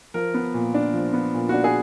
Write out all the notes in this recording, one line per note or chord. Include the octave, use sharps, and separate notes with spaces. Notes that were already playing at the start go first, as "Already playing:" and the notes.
F3 A#4
B3
A#2
D4
F3
B3
A#2
D4 F#4
G#4